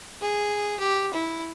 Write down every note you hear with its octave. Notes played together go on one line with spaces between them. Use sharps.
G#4
G4
E4